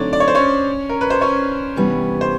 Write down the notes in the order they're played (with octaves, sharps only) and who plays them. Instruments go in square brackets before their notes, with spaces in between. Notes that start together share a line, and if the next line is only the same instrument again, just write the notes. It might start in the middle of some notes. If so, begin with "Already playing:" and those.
Already playing: [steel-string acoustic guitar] D3 F#3 A3 C4 D#4 [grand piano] D4 C#5 D5
[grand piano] D5
C#5
C5
C#4 C#5
A#4
B4
C5
C#4 C#5
[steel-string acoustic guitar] C3 E3 G3 B3 D4
[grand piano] C5